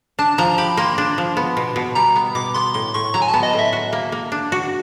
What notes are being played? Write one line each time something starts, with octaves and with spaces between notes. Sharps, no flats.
D4 A5
F3 A#5
G4 B5
A#3 C6
D4
F3
B3
B2
B2
G3 A#5
B3
B2 D6
B3 C6
A2 C6
A2 C#6
F#3 A#5
G#5
A5
B3
D#5
A2
E5
F#4
A#3
A#3
D4
F#4